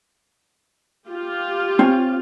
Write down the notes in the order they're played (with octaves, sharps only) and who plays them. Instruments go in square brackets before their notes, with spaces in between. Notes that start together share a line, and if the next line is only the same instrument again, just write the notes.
[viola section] F4 G4
[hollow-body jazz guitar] C4 C#5 G#5